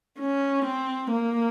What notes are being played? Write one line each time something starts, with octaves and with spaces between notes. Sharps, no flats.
C#4
C4
A#3